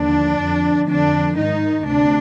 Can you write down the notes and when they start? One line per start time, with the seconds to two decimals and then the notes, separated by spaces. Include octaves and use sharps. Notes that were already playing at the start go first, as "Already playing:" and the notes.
Already playing: D#2 D3 F3 D4
0.39 F2 D3 F3
0.88 F2 D3 F3 D4
1.37 G#2 D#3 D#4
1.87 D2 C3 D4